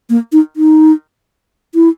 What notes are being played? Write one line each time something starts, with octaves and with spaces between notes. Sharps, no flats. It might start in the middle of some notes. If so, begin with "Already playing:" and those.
A#3
D#4
D#4
E4